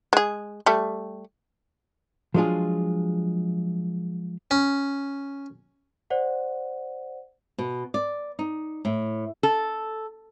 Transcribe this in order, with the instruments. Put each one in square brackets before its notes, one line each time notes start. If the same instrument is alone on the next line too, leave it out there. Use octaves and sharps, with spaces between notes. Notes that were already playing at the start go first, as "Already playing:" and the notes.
[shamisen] G#3 G#4
G3 A3
[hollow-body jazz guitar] F3 F#3 G#3 D4 F4 G#4
[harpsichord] C#4
[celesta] C5 D5 F#5
[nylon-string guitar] B2
D5
D#4
A2
[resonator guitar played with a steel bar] A4